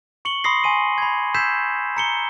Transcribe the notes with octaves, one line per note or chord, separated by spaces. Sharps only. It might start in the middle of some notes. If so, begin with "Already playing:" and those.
C#6 C#7 F#7 G7
B5 C6 D#6 A#6 C7
G#5 C6 D#7
B5 G#6
E6 G6 G#6 B6 C7 E7
A#5 C#7 G7